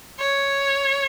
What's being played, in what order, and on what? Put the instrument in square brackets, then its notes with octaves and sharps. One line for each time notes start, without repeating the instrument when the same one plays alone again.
[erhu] C#5